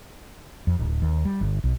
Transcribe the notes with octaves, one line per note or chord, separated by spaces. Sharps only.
F2
D1
D#2
G3
G1
B1